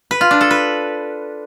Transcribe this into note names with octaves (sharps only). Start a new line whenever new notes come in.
B4
F4
D4
A4
B4